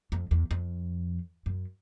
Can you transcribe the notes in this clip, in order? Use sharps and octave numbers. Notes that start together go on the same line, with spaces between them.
F2
E2
F2
F#2